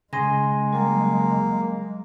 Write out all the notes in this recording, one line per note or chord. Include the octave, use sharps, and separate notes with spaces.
C#3 G#3 G#5 C6 A#6
F#3 G3 A#3